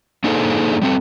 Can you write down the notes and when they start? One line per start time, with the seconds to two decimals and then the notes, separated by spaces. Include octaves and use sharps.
0.24 A#3 D4 D#4 G#4 A4 C5
0.82 G3 C4 A4